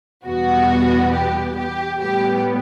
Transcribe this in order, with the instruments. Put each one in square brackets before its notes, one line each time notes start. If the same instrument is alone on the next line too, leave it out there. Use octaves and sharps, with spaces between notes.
[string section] E2 B2 G3 B3 F#4
G4
G4
A2 G3 B3 G4